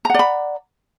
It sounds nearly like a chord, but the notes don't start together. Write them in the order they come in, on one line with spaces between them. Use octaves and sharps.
A#5 F#5 D5 B5